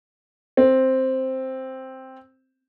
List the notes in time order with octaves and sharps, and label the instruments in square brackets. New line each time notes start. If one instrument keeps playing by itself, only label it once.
[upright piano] C4